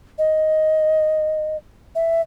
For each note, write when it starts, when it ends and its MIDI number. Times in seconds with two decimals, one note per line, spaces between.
0.18 1.57 75
1.95 2.21 76